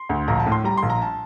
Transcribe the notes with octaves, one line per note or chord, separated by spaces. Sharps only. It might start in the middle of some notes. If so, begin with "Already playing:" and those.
Already playing: C6
D2
A#1 A#5
A5
A2
C6
G3 A#5
C6
A#1
A#5
A5